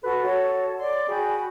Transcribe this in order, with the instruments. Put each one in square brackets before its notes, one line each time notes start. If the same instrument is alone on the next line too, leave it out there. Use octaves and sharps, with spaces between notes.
[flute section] F#4 A4 [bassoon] B4
[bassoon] F#4 [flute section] A4 [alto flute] C#5
[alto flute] C#5 [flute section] D5 C6
[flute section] F#4 G5 B5 [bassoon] G#4 [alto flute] G#5